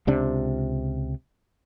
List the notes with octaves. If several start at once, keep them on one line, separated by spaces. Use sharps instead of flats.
C#2 C3 D4